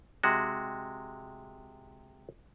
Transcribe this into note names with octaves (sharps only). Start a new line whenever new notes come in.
C3 G#3 F#4